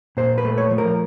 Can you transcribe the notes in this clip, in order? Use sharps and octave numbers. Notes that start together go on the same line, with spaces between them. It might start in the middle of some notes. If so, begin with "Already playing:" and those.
A#2 C5
B4
A3
C#5
F3
A#4